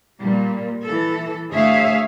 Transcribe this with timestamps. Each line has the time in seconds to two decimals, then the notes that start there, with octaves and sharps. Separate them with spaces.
0.19 A#2 G3
0.84 E3 A4
1.50 D2 G#4 C#5 E5 F5